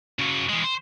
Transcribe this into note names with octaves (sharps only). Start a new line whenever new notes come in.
C#3 F#3
E3 G#3
C5